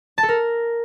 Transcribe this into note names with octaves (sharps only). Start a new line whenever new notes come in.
A5
A4
A#4